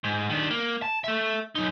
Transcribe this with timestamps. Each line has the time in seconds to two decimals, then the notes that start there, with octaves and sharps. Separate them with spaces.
0.04 G#2
0.30 D#3 D4
0.51 A#3
0.82 A5
1.04 A4 E5
1.55 F#2 D#4